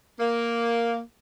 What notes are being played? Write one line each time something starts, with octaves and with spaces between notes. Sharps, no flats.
A#3